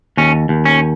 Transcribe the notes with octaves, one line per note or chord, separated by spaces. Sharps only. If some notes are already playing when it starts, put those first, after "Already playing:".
D#2 C#4
D#2
C#4